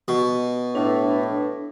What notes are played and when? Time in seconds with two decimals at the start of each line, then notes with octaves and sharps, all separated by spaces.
0.08 B2
0.75 A2 D4 B4